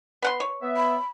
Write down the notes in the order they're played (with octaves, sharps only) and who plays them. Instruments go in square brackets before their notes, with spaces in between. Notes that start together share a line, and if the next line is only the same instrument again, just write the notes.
[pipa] B3 F#5 C6
C#5
[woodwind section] B3 E5
[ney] B5